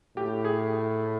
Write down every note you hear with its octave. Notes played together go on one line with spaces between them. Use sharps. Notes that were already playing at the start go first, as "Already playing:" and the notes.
A2 G4
G#4